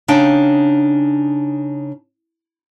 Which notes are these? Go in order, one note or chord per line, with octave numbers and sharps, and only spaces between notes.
C#3 D4 D#4 F5 G5